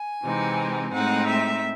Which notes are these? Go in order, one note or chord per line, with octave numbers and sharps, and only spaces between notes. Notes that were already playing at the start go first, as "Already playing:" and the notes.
Already playing: G#5
C3 E3 G#3 C4 D#4
A2 G#3 C4 D#4 F#5
E5